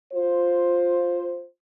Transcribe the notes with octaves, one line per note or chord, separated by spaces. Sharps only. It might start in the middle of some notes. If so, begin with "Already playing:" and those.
F4 C5